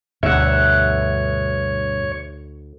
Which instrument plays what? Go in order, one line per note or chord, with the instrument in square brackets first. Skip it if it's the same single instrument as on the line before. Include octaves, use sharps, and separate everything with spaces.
[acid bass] D2 [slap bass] G2 B2 [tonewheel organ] C#5 [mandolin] E5 F#5